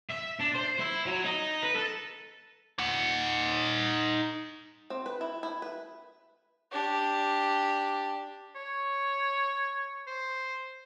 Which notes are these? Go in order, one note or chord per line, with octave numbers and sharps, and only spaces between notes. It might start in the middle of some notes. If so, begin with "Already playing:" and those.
E5
D4
C5
E4
F#3
D#4
B4
A4
D#4 F#5
C4
B4
E4
E4
B4
D4 G4
C#5
C5